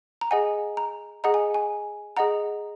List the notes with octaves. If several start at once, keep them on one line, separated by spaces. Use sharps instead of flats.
A#5
G#4 D#5 F#5 G#5
A#5
G#4 D#5 F#5 A#5
G#5
G#5
G#4 D#5 F#5 A#5